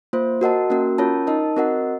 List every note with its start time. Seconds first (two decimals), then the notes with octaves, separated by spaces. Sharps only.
0.13 A#3 F4 C5
0.41 F#4 A#4 D#5 F#5 A5
0.70 A#3 C#4 F#4 A#4
0.98 C#4 F4 A#4 C#5 A5
1.27 D#4 A#4 D#5 A5
1.56 C4 F#4 A#4 D#5 F#5